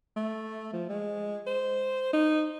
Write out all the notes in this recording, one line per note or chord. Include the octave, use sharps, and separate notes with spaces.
A3
F3
G#3
C5
D#4